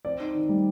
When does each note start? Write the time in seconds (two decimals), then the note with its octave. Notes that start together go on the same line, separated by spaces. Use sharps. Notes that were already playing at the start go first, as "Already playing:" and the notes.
0.05 C4 D5
0.20 D#4
0.35 D#3
0.49 G3